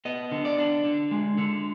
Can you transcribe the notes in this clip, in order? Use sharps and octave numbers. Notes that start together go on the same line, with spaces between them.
B3 D#5
D3
D5
D4
D3
G#3
D3